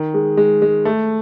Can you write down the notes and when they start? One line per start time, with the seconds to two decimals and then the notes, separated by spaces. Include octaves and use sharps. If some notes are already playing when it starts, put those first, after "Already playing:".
Already playing: D#3
0.14 G#3
0.37 G#3
0.62 G#3
0.85 A3